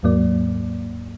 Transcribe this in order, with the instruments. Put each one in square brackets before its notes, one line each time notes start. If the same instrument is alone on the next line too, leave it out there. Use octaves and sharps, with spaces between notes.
[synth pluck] D#2 G#2 F#3 A#3 D5